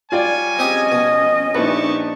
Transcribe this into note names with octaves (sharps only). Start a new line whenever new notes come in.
G3 F4 C#5 D5 G5 G#5
C4 C#4 G4 G#4 D#5
B2
A#1 D#4 E4 G4 B4 A5 C#6